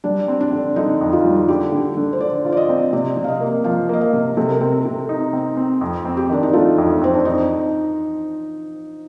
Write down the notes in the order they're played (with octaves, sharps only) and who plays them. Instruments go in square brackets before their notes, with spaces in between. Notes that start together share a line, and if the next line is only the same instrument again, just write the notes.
[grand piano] G3 [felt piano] D4
[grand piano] C4
[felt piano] D4
[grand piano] D3
[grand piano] D3 [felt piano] D#4
[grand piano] F2
[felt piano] F4
[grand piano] G3
[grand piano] D3 [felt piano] G4
[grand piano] D3
D3
[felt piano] C5
[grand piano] D3 [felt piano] D5
[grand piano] F4
[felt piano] D5
D#5
[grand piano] C4
[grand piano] C3 [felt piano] D5
[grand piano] C3
[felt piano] F5
D#5
[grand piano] A#3
[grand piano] F3 [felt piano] F5
[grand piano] A#3 [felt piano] D#5
[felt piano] F5
[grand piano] C3
[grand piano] C3 [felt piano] A4
[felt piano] A#4
[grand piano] C4 [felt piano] A4
[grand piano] C3
D#4
C4
C4
F2
C4
[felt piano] G4
[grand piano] D#3 [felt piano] D4
[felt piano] D#4
[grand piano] A3 [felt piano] F4
[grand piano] F2
[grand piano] F2 [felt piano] C4
[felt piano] D4
D#4